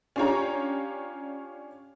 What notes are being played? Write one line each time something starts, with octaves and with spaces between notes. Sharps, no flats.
C#4 D4 F4 G4 C#5 A#5